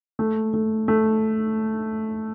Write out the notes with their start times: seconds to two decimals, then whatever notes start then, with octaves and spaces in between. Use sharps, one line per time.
0.19 A3
0.54 A3
0.88 A3